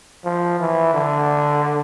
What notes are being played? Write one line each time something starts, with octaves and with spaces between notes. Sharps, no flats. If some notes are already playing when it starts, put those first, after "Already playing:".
F3
E3
D3